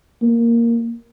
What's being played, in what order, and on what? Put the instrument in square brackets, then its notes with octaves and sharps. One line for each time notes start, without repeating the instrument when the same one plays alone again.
[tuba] A#3